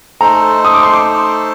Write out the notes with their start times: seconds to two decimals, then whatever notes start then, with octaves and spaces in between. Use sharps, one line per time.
0.21 A3 D#4 A4 C5 A#5
0.65 D#6
0.74 D6
0.83 C6
0.93 D6